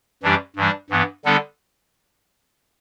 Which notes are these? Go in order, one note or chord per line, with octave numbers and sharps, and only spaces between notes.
F#2 E3 G3 D4 G4
G2 E3 G3 D4
G2 E3 B3
D3 G3 B3 D4 A4